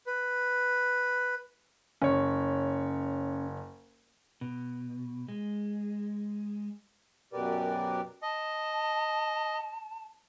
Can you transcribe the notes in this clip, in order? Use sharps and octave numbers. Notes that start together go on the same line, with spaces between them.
B4
F#1 C#4 C#5
B2
G#3
F#2 B2 G4 A#4 B4 D5
D#5 A5